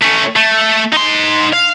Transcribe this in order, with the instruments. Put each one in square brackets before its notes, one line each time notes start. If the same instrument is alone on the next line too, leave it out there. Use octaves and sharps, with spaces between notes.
[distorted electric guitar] A3 C#4
A3
D#4 C6
F5